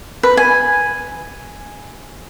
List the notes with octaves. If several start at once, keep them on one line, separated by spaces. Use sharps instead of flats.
B4
G#5